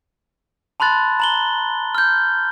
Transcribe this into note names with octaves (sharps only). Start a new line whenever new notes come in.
A5 B5 C6 F#6 A6
A#5 F#7 G7
F6 G6